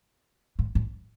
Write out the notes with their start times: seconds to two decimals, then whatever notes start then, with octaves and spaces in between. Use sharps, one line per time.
0.59 G#2
0.75 G#2